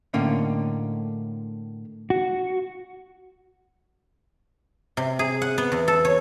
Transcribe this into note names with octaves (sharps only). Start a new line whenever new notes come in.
A2 D3 A#3 C4 C#4 D#4
F#4
C3
G#4
F#5
B3
E2
A4
C#5